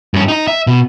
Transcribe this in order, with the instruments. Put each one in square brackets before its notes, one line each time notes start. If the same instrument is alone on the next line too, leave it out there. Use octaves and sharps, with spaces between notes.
[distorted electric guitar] G2 C#4
D#4 D#5
E5
B2